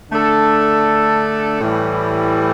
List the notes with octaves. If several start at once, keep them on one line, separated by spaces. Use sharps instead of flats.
D3 A3 D4 A4
A2 E3 G3